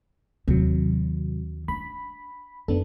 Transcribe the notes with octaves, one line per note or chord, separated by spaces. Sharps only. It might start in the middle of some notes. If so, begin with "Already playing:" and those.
D#2 C3 D#3 F#3
D4 B5
F#2 B3 D4 A4